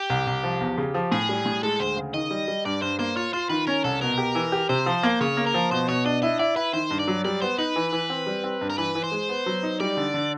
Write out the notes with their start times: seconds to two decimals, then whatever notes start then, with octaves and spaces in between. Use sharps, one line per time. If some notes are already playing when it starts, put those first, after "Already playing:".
Already playing: G4
0.10 C2
0.27 C2
0.43 F3
0.61 E2
0.78 C#3
0.94 F3
1.12 A2 G#4
1.29 G3
1.46 A2
1.63 G#3 A4
1.80 D2 C5
1.97 C#3
2.14 D#3 D#5
2.31 G3
2.48 G3
2.65 G2 D5
2.82 G2 C5
2.99 A#3 C5
3.16 F4 C#5
3.33 F4 C5
3.49 D#3 B4
3.67 C#4 A#4
3.84 C2 A4
4.01 B2 A#4
4.18 G4
4.35 E3
4.52 G4
4.69 C3 C5
4.86 F3
5.03 A#3
5.21 C#3 C#5
5.37 A#3
5.46 A#4
5.54 F3
5.71 B2 C5
5.88 B2 C#5
6.05 D4 D#5
6.22 E4 D#5
6.39 E4 D5
6.56 E4 B4
6.73 D#3 C5
6.91 G2
7.00 D5
7.08 F#3
7.24 G3 D5
7.41 B3 C5
7.58 D#4 B4
7.76 E3
7.93 E3
8.10 C4
8.27 G3
8.44 C4
8.61 G2
8.70 A#4
8.78 E3 B4
8.95 E3
9.04 C5
9.12 G#3
9.29 B3
9.46 F#3
9.63 D#4
9.80 G3 D5
9.97 D3
10.14 D3